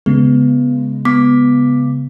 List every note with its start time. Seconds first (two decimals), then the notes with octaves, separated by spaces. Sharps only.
0.06 C#3 G#3 B3
1.05 B3 D6 B6